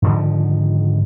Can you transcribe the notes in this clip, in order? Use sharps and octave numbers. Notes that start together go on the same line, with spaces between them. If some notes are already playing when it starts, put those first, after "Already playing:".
G#2 D3 D#3 F3